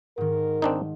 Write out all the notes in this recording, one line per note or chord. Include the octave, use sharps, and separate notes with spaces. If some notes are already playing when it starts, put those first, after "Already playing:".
G#2 D#3 A#4
C4 D4 D#4